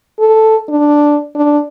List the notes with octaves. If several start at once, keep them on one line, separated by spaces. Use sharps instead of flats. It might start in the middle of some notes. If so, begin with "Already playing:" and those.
A4
D4
D4